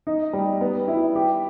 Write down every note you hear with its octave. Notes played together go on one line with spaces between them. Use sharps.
D#4
G3
B3
E4
G4